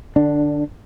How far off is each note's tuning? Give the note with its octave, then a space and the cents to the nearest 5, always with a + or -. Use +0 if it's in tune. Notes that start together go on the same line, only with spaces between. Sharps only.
D3 +25 D4 +0